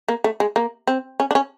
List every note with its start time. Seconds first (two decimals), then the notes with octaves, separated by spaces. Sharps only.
0.08 A#3
0.24 A3
0.40 G#3
0.56 A#3
0.87 C4
1.20 C#4
1.31 D4
1.35 C#4